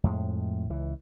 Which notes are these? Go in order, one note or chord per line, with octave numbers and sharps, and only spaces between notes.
F2 A2 G#3
C#2 E3